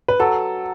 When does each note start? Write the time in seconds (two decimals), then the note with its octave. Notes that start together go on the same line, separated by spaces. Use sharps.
0.08 B4
0.20 F#3 A4